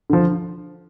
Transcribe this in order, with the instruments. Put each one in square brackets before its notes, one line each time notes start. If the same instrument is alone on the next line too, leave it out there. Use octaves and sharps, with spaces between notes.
[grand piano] D3 F3